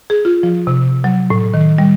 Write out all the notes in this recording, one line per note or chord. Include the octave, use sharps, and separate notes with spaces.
G#4
F4
F3
C3
F#3
A2
D#3
G3